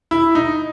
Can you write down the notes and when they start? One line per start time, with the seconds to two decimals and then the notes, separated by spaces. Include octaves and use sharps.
0.11 E4
0.35 D#4